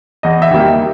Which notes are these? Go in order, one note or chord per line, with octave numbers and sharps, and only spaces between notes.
E2 D#5
E5
D#3 G3 A#3
G5